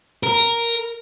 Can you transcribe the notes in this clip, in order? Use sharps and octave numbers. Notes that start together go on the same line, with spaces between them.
A#4